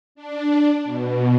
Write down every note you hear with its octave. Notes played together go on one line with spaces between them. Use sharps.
D4
B2